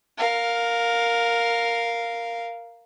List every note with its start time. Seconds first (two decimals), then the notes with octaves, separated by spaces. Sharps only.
0.18 A#4 F5